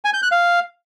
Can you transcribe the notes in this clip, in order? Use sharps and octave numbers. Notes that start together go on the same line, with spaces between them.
G#5
G6
F#6
F5